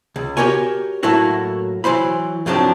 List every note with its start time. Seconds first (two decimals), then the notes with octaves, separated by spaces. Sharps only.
0.16 C#2
0.37 F#4 G4 A#4 C#5 G#5
1.03 A2 F#3 A3 A#3 E4 F#4
1.84 E3 F#3 C5 B5
2.46 F#2 A2 F3 F#3 C4 D4